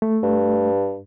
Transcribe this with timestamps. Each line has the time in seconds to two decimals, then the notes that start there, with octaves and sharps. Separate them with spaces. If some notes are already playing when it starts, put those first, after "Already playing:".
0.02 A3
0.23 G2